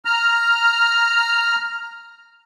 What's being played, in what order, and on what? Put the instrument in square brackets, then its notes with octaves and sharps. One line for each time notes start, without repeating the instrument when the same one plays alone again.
[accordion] A#5 F6